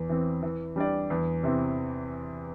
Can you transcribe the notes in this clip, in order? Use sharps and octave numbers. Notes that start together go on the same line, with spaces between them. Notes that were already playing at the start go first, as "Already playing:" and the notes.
Already playing: E2
E3 C4
E3
G3 D4 G4 D5
E2
C3 E3 C4